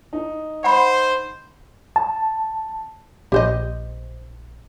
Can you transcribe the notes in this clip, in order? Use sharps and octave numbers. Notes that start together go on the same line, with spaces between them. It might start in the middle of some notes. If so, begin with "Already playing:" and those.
D#4
C5 F#5 B5
A5
A#1 G4 C5 D#5